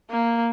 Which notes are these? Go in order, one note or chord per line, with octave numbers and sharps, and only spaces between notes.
A#3